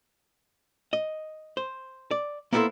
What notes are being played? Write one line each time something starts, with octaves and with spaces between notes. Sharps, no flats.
D#5
C5
D5
A#3 B3 E4 F#4 A4 C5